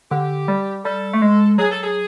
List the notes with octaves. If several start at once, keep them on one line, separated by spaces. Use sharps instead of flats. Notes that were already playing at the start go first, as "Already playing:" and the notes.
D3 G4
G3
G3 A4
A3
G#3
F#3 G#4
A4
G#4